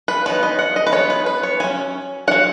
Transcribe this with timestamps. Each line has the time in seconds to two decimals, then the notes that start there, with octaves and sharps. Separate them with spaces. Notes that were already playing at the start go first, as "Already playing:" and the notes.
0.08 B4
0.26 F#3 B3 D#4 B4
0.43 D#5
0.59 F#5
0.76 D#5
0.87 B4
0.92 F#3 B3 D#4 C#5
1.10 B4
1.26 B4
1.43 C#5
1.60 F#3 C#4 G#5
2.27 F#3 C#4 F#5